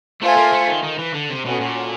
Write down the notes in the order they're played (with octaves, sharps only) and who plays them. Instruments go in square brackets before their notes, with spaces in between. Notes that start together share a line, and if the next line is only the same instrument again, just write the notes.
[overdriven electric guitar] A3 [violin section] F4 A4 C5 E5 G#5
[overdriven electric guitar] A#3
A3
D#3
D#3
E3
D3
C3
[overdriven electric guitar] B2 [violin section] C#4 F#4 A4
[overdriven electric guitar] A#2